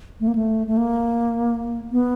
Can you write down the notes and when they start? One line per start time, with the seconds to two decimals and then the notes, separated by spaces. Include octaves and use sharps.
0.20 A3
0.28 A#3
0.35 A3
0.67 A3
0.77 A#3
1.92 B3